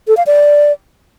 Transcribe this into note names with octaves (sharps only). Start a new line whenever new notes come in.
A4
F5
D5